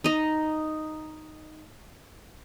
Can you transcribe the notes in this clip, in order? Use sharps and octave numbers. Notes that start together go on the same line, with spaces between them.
D#4 D#5